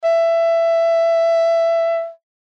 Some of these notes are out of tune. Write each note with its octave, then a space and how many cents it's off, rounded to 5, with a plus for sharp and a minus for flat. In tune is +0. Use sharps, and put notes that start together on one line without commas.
E5 +15